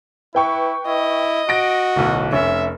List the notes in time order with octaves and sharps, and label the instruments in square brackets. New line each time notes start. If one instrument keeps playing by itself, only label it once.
[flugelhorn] E4 [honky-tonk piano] B4 G5 C#6
[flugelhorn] E4 [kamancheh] D#5
[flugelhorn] F#4 [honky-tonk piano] A#6 D7
[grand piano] D1 B1
[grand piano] F1 C#4 [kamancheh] E5